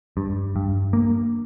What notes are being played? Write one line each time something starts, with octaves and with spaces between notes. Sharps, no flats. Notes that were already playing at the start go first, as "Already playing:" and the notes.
G2
G2
A#3